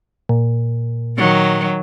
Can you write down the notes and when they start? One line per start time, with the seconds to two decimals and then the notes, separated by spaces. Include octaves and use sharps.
0.29 A#2
1.18 D#3 F#3